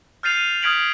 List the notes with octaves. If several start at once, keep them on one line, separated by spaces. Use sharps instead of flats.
F6 G6 A6 C7 D#7 F7
D#6 F6 G#6 B6 D7 F#7